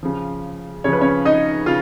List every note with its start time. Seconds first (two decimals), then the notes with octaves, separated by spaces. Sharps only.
0.03 C#3 F3
0.84 C#3 F3 C#5
0.93 B4
1.01 C#4 C#5
1.25 D#4 D#5
1.66 C#3 F4 F5